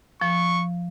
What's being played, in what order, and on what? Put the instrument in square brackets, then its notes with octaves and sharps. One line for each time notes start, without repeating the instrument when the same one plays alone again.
[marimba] F3 [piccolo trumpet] C#6